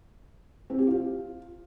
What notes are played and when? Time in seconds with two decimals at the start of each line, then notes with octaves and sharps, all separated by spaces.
0.70 C4
0.78 G4
0.87 F4